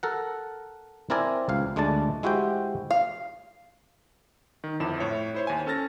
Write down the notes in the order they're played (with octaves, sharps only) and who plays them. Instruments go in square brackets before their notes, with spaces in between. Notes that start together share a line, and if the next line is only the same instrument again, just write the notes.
[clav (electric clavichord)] A4 A#4 F#5
C4 E4 A#4 D5 G#5
C#2 F5
D2 G#3 A3 D4 A5
G#3 E4 F#4 G4 C5 G5
[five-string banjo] F5
[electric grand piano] D#3
G1 F2 E4 E7
A2 C#5
E4 C5 C#5
D#2 G#5
C#4 A4 A5 F6 A6 A#6